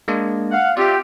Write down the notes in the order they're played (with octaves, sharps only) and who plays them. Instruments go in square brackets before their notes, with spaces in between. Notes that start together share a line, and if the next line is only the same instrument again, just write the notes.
[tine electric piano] G#3 A#3 D4
[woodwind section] F5 F#5
[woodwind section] C4 F4 G4 [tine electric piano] D5 E5